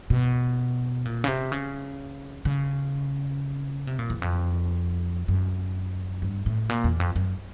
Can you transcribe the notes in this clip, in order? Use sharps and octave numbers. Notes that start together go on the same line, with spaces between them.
B2
A#2
C#3
C3
C#3
C#3
C3
A#2
E2
F2
F#2
G2
A2
A#2
E2
F2
F#2